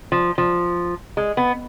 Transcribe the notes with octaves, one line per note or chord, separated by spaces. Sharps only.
F3
F3
G#3
B3